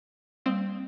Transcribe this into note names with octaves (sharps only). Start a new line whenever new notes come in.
G3 A#3 C4